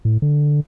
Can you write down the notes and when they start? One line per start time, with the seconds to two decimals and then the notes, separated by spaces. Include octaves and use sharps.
0.05 A2
0.22 D3